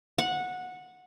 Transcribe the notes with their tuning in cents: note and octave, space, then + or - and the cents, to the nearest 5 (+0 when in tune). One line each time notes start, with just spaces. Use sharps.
F#5 -15